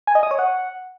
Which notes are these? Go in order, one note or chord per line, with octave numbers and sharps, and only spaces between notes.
G#5
D#5
D#6
C#5
F#5